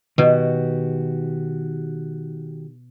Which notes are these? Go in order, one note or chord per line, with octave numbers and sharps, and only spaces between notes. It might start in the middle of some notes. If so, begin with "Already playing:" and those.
B2 D#3 F#4 G4